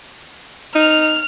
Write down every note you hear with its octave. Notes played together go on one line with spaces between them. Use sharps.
D#4 F6 F7